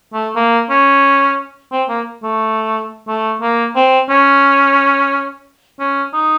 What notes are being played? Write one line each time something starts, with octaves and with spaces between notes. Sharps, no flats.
A3
A#3
C#4
C4
A#3
A3
A3
A#3
C4
C#4
C#4
D#4